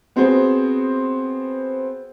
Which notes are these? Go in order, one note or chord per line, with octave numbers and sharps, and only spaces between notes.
B3 C4 F#4 G#4 C5